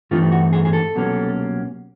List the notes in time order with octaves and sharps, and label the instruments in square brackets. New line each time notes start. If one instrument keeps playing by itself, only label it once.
[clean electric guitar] G2 E3 A3 C4 D#4 F4
F#4
G#4
G#4
A4
C2 B2 F#3 A#3 C#4